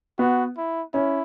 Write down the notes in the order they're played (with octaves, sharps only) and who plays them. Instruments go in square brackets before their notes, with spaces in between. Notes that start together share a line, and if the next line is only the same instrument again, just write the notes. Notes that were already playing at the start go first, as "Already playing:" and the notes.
[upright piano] B3 [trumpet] F#4
[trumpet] E4
[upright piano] C#4 [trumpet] E4